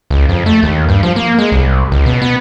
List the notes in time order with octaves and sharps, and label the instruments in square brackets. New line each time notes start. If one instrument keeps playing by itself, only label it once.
[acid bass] C#2
F2
A3
D#2
G2
F3
A#3
G#3
C2
C#2
B2
B3